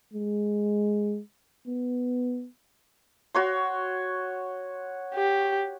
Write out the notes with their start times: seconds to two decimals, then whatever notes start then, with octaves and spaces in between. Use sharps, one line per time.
0.13 G#3
1.68 B3
3.35 F#4 C#5 C6
5.14 G4